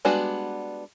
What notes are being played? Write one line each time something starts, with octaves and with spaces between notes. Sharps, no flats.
G3 G#3 B3 D4 F#4